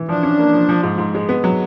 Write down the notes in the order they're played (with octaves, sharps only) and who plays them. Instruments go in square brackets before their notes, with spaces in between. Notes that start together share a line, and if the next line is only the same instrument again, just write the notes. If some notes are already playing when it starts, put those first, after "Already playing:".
Already playing: [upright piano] E3
[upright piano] F3 [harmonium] D4
[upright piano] C#4
A#3
F3
F3
G#2
G#2
G#3
B3
F#3